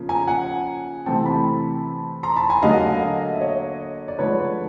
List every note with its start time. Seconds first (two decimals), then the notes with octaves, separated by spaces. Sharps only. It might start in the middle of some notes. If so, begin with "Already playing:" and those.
Already playing: C#3 F3 A#3
0.09 G#5 A#5
0.27 F#5 G#5
1.06 C3 E3 A3 C4 G5 A5
1.26 A5 B5
2.23 A#5 C6
2.36 A5 B5
2.49 G#5 A#5
2.62 D3 F#3 A#3 D#5 F5
3.34 E5
3.40 C#5 D#5
4.08 D5
4.19 D3 F3 G#3 B4 C#5